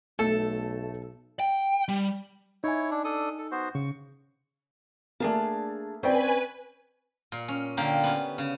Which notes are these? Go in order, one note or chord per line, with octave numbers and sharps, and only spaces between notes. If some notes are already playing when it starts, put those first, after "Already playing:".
B1 A3 A4
G5
G3
D#4 E4 C#5 G#5
D4
D4 A4 D#6
A4
B3 F#4 C5
C#3 C#6
A3 A#3 D4 G#4 A5
C4 C#4 B4 D5 G5 G#5
A#2
C#4
D3 A#3 G4
B3 C#4
C#3